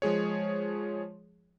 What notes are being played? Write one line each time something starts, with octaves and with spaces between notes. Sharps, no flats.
F3 G#3 G#4 C#5